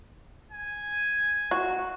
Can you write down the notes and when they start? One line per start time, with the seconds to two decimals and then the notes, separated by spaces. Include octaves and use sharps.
0.51 G#5
1.51 F#4